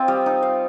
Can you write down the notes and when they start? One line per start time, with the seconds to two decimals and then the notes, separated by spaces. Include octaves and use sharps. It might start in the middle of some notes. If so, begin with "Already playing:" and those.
Already playing: C4 F4 D#5
0.08 G3
0.26 D#4
0.43 F5